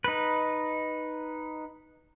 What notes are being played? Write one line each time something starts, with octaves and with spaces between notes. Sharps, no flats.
D#4 B4